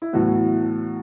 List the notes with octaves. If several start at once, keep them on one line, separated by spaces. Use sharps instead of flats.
E4
A2 E3 F#3 B3 F#4